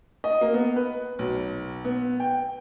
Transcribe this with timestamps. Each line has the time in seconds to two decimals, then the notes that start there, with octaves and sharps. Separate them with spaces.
0.24 D#5
0.41 A#3
0.54 B3
0.76 B4
1.19 B1
1.85 B3
2.20 G5